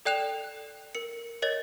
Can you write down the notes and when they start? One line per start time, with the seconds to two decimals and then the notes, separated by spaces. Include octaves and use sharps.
0.05 A4 D5 G5 F#6 E7 F7
0.95 A#4 C#7
1.42 A#4 C#5 D#5 A6